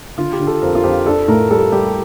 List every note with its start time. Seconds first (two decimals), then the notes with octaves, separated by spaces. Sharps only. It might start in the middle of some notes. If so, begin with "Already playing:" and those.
0.18 D3 F4
0.33 G4
0.40 D3
0.47 A4
0.62 F2 A#4
0.75 F4
0.84 F2 G4
1.06 D4 A4
1.28 A2 A#4
1.51 G3 A4
1.72 G3 G4